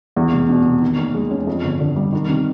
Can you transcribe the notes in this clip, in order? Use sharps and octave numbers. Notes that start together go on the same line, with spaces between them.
E2
F1
B2
F1
D#3
D#2
G#3
C#4
F2
G1
D3
G3
D#3
C3